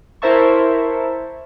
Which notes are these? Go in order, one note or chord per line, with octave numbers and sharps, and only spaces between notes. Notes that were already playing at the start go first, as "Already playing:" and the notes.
E4 A#4 C5 E5 A5 C#6